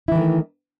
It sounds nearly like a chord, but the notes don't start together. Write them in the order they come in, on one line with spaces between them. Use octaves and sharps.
E4 E3 D#3 A3